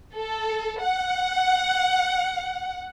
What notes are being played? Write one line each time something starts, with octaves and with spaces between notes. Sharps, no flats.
A4
F#5